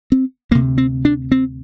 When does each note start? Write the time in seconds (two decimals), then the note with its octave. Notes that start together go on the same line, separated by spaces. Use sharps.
0.12 C4
0.51 D2 A#3
0.55 C3
0.78 C4
1.05 D4
1.32 C4